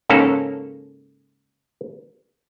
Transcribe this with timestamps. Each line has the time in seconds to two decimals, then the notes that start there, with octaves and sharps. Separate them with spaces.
0.09 G#2 C#3 A#3 C#4 A4